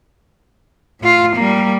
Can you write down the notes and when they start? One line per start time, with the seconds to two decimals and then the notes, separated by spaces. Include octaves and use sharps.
1.01 A2 F4
1.36 G3 A#3